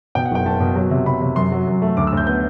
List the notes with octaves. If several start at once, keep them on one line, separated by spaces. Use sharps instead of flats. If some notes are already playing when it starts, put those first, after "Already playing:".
B2 G5
F#5
F#1 G5
F#1 A5
B2
F#3
C3
C3 B5
C3
F#2 C6
F#3
F#2
A3
D2 D6
E6
D2 G6
B3 G6